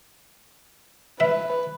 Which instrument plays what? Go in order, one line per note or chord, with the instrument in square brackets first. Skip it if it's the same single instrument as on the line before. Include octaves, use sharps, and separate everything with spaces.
[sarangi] B4 [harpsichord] E5